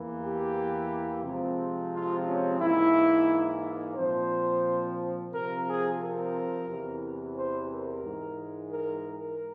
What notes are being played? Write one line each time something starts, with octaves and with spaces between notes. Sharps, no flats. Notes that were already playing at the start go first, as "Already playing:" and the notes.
Already playing: E2 E3 A#3
G4
C3 F3 G#3 C4
F4
C#4
G#2 E3 A#3 E4
A#2 F3 C4 C5
C3 F3 C4 A#4
G#4
A#4
E2 C3 E3
C5
A#4
G#2 E3 G#3
A#4
A#4